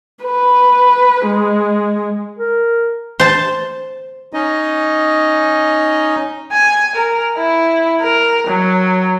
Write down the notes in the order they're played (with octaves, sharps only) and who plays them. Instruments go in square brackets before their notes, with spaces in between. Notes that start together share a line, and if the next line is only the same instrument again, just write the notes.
[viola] B4
G#3
[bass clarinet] A#4
[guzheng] C5 A5
[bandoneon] C#4 D#4 D#5
[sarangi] G#5
A#4
E4
A#4
F#3